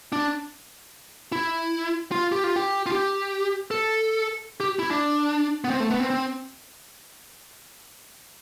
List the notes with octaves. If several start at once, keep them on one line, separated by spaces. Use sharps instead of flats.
D4
E4
F4
G4
F4
G4
F4
G4
A4
G4
E4
D4
B3
C4
A3
B3
C4
C4